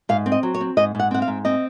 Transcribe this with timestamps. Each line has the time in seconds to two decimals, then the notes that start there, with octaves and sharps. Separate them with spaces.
0.09 G#2 F5
0.26 C4
0.32 D#5
0.43 F#3
0.55 C#5
0.61 C4
0.77 G#2 D#5
0.95 G#2 F#5
1.11 C4 F#5
1.22 F5
1.28 G#2
1.45 C4 D#5